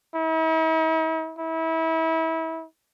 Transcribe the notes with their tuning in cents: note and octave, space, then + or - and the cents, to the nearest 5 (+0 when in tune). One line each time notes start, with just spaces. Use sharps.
E4 -45
E4 -30